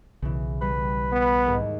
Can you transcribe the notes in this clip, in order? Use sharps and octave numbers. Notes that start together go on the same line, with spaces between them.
B1 C#3 E3
G3 B4
B3
D#2 G#2